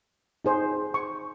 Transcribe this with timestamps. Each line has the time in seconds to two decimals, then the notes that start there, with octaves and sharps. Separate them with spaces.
0.45 D#4 G#4 C5
0.94 C#6